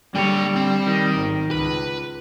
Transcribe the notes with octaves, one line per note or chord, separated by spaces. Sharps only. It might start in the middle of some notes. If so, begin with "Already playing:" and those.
D3 G3 A#3 C#5 G5
C4
D#3 D#4
G#1
C#2 B4